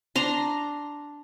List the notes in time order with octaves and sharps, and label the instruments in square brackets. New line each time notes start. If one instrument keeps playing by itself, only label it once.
[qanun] D4 A#5 C6